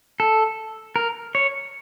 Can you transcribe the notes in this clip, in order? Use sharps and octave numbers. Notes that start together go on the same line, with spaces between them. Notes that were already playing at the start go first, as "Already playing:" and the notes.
A4
A#4
C#5